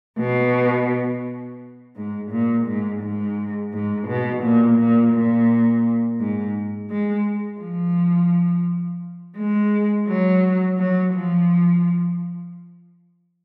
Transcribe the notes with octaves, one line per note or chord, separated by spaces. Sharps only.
B2
G#2
A#2
G#2
G#2
G#2
B2
A#2
A#2
A#2
G#2
G#3
F3
G#3
F#3
F#3
F3